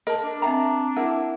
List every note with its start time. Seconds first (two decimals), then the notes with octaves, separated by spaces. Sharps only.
0.07 A#4 D#5 A5
0.23 D4
0.42 C4 E5 G5 A#5
0.96 E4 A#4 F#5